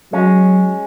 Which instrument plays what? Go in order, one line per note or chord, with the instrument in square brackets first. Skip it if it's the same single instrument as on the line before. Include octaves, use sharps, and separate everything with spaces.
[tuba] F#3 [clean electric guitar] G#3 C#4